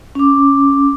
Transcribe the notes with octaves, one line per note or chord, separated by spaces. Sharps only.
C#4 D6